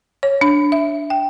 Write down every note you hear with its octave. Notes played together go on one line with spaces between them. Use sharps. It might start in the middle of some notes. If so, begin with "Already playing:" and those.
C#5
D4
E5
G5